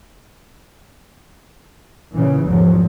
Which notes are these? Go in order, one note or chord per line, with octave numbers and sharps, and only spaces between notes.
A#2 C#3 E3
G#1 E2 F3 F#3